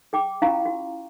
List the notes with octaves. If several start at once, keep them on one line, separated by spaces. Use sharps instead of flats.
G#4 G5 D6
C#4 E4 F4 F5 A#5 C#6
F#4